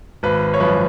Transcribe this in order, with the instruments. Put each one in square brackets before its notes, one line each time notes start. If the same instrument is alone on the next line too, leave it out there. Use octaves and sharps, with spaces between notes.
[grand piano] G#1 B4
C#5
F#2 F3 B4